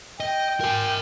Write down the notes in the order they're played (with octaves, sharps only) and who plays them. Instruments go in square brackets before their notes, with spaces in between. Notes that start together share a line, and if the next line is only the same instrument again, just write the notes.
[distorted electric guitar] D#5 [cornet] G5
[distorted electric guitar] A#4 G#5